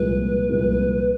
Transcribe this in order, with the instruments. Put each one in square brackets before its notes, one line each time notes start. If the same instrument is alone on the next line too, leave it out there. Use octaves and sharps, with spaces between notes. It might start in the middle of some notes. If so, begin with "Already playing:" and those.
Already playing: [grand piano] C2 A#2 F3 G#3 [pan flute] B4
[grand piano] C2 A#2 F3 G#3